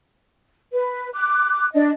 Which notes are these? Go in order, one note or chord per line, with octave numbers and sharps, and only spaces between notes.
B4
D6 F#6
D4 D#5